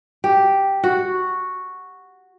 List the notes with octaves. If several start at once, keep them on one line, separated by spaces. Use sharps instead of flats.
G4
F#4